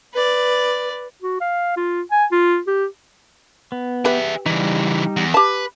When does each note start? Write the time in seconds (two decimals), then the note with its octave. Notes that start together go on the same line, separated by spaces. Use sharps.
0.13 B4 D5
1.22 F#4
1.41 F5
1.77 F4
2.11 G#5
2.32 F4
2.67 G4
3.72 B3
4.05 G4 G#4 B4 E5
4.46 C#3 E3 G3 D#4
5.17 E2
5.34 G4 B4 A5